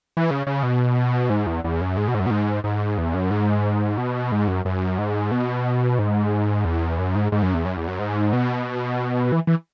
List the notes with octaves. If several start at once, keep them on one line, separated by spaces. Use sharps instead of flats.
E3
C#3
C#3
B2
G#2
E2
E2
F#2
G#2
B2
G#2
F#2
B2
G#2
G#2
E2
F#2
G#2
B2
G#2
F#2
F#2
G#2
B2
G#2
E2
F#2
G#2
G#2
F#2
E2
F#2
E2
F#2
G#2
B2
E3
E3